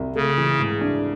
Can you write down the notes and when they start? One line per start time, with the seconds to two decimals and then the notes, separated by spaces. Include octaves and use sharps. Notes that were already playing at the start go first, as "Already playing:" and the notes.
Already playing: C2
0.15 C#3 A3
0.38 E3
0.59 G#2
0.81 D4